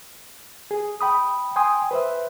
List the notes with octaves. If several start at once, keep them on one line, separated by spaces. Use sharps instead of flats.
G#4
G5 B5 D#6
G5 G#5 C6 D#6
B4 C5 E5